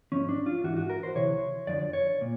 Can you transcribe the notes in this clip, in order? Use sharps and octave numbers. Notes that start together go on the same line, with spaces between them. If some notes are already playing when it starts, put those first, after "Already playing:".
G#2 F3 C#4
D4
F4
G#2 E3 F#4
F#4
A#4
C5
D2 C3 E3 C#5
F#2 D3 F3 D5
C#5
A#2